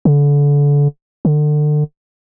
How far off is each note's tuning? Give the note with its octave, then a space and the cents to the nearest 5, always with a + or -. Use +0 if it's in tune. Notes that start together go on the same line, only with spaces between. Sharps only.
D3 -30
D3 +30